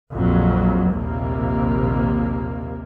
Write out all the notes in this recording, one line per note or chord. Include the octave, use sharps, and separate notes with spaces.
A#1 F2 F#3
A#1 D#2 C3 A#3